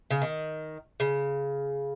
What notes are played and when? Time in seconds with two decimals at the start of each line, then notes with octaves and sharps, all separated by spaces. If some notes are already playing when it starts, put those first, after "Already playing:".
0.11 C#3
0.22 D#3
1.00 C#3